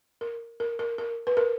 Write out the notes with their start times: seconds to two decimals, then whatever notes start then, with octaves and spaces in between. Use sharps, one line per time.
0.21 A#4
0.60 A#4
0.79 A#4
0.98 A#4
1.27 B4
1.37 A#4